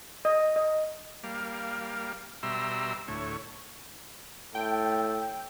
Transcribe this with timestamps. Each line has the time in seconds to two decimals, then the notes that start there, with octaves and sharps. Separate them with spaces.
0.25 D#5
0.56 D#5
1.24 G3 A#3 F5
2.43 B2 G3 E5 A#5 C6 E6
3.08 D2 A2 C#5
4.55 A2 A4 G5